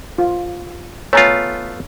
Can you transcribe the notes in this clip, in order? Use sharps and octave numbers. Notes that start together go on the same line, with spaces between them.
F4
A3 B3 F4 C#5 G#5 A#5